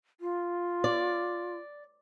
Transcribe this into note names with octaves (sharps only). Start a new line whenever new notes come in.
F4
D5